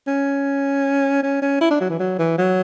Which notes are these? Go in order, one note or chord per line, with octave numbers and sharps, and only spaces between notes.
C#4
C#4
C#4
E4
D4
F#3
E3
F#3
E3
F#3